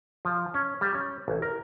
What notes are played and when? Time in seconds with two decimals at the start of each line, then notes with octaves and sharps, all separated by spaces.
0.25 F3
0.54 C#4
0.81 G3
0.94 C#4
1.28 A1
1.42 A#4